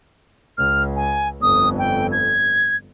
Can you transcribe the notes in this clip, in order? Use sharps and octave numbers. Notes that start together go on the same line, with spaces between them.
C#2 F6
G#5
G1 F2 D#6
G5
G#6